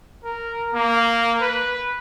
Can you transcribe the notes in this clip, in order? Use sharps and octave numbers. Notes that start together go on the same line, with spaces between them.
A#4
A#3
B4